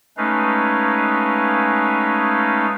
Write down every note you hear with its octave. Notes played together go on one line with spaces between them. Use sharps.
G#3 A3 C#4 D#4 B4 F5